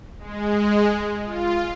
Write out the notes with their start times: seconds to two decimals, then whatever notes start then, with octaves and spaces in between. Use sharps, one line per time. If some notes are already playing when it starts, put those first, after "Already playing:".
0.19 G#3
1.24 F4